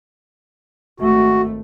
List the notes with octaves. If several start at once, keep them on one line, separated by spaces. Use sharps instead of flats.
G#1 A3 F#4